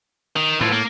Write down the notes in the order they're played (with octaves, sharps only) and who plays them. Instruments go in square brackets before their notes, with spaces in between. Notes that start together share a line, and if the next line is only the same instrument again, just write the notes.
[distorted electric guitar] D#3
[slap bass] A2 [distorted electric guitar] E3 F4
[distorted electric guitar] A#3